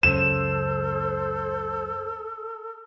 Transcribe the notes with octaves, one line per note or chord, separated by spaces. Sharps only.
C#2 F#2 C#3 A4 C5 E7